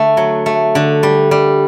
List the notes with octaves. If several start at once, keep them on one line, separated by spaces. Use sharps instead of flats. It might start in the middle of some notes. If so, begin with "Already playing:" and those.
Already playing: D3 A3
F#3
A3
D3
G3
G3